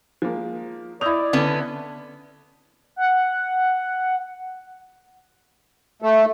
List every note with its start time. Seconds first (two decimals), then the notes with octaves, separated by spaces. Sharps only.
0.22 F3 G#3 A#3
1.01 E4 D5 D#5 E6 G6 F7
1.33 D3 B3 C#4
2.96 F#5
6.02 A3